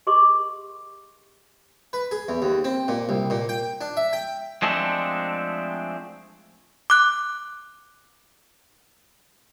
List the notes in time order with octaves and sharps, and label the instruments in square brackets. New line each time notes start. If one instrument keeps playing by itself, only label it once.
[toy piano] G4 G#4 A#4 D#5 C6 D6
[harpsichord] B4
G#4
E2
D#2
C4
A#2
C2
A#2
G5
D4
E5
G5
[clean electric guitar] F3 G#3 A3 C4 D4
[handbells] D6 F#6